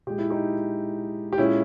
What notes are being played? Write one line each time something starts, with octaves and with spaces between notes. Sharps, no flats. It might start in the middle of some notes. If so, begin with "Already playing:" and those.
A#2 G#3 G4
E4
D#4 G4
G4
A#2 G#3 C#4 E4